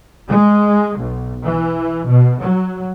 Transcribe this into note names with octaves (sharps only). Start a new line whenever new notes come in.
G#3
B1
E3
B2
F#3